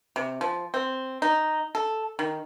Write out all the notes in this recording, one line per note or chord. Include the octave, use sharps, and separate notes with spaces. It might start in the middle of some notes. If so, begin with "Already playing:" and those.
C3
F3
C4
D#4
A4
D#3